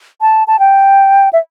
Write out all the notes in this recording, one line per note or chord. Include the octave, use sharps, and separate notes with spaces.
A5
A5
G5
E5